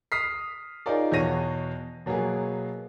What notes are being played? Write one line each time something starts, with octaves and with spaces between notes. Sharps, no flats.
D#6 F6 B6 C7
D#4 F4 G#4 A#4 C#5 D5
E2 B2 B3 C#5 A#6 D#7
B2 F#3 A#3 B3 G#4